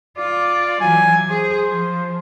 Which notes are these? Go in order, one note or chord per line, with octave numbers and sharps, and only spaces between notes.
F4 D5
E3 F#3 G#5
G#4 C5
F3